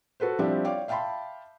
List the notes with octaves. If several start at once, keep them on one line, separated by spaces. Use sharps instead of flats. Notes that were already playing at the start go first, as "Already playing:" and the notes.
F#4 A4 B4 C5
F3 G3 C4 D4 E4 G4
C#5 D5 F5 G5 D6
E5 F5 G5 A5 B5 C6